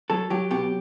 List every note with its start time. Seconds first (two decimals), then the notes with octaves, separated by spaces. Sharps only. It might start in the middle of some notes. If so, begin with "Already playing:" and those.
0.10 F#3 A4
0.30 F#3 G4
0.51 B2 G4